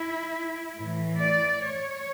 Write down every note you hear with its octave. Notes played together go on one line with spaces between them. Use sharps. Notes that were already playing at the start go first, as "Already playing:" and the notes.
Already playing: E4
A2 E3
D5
C#5